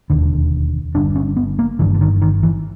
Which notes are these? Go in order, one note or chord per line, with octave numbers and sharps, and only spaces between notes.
E1 D#2 D3
G1 G2 D3 D4
C#4
B3
A#3
G1 G2 D3 E3
D3
D#3
D#3
E3